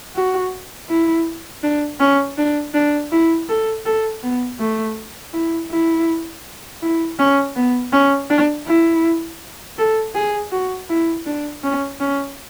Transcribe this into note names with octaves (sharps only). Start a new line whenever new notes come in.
F#4
E4
D4
C#4
D4
D4
E4
A4
A4
B3
A3
E4
E4
E4
C#4
B3
C#4
D4
E4
A4
G#4
F#4
E4
D4
C#4
C#4